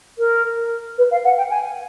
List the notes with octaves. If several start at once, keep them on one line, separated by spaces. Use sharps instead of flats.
A#4
B4
F5
F#5
G5
G#5